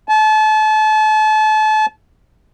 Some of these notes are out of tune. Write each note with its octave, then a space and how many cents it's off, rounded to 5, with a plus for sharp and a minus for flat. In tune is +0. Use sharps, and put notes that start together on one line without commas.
A5 -35